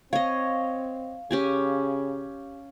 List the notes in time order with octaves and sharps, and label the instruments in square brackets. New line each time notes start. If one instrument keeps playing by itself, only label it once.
[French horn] C4 [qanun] C#5 D#5 [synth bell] F5
[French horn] C#3 [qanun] C#4 G4 G#5